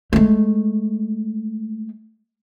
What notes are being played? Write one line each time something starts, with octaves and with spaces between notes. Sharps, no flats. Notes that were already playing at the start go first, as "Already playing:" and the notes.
G#3 A3